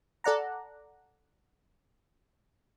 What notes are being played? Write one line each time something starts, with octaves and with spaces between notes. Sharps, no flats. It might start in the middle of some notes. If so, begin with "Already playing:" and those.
A4 D5 F#5 A#5